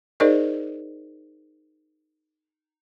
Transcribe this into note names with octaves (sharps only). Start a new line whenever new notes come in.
D#4 G#4 A#4 C5 D5 D#5